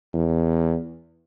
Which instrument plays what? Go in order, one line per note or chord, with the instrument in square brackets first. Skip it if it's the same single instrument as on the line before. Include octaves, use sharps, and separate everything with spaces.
[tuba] E2